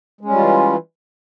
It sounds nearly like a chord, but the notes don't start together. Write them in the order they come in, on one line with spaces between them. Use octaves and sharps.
G#3 C#4 G3 F4 E3